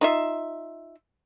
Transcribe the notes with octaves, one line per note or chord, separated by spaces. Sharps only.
D#4 F4 E5